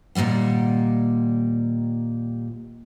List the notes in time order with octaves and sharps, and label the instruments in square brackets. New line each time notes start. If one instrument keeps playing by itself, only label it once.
[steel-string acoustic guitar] D#2 A#2 E3 G3 F#5